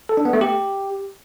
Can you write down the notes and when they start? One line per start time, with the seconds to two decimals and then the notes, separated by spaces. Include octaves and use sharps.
0.09 A4
0.17 D4
0.25 B3
0.33 A3
0.41 G4